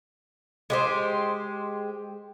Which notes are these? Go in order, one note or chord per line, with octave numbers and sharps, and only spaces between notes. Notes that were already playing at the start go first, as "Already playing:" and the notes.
G#3 G4 C5